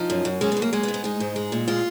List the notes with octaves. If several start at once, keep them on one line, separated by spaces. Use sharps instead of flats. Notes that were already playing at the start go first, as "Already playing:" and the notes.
Already playing: F3 D#4
F#2
F#2
G#3 C#4
B3
F#2
A#3
G#3 A#3
B3
G#2
B3
G#3 D#4
G#2
G#3
A#2
G#3 F4